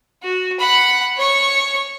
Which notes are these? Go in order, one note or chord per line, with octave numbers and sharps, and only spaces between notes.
F#4
F#5 B5
C#5 C#6